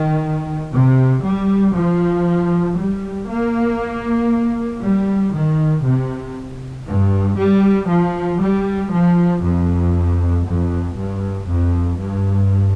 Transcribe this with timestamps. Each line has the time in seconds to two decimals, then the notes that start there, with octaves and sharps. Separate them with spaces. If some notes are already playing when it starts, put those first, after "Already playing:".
Already playing: D#3
0.72 C3
1.23 G3
1.74 F3
2.77 G3
3.28 A#3
4.82 G3
5.34 D#3
5.84 C3
6.87 G2
7.37 G3
7.89 F3
8.41 G3
8.92 F3
9.43 F2
10.46 F2
10.97 G2
11.49 F2
12.00 G2